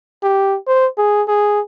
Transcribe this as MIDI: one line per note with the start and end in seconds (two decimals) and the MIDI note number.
0.23 0.57 67
0.67 0.87 72
0.98 1.23 68
1.28 1.60 68